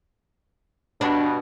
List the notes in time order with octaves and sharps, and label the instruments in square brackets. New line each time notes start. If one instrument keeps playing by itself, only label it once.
[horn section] G2 B2 [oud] D4